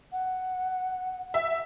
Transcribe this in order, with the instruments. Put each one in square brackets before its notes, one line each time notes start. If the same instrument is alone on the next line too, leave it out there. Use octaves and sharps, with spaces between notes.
[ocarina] F#5
[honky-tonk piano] E5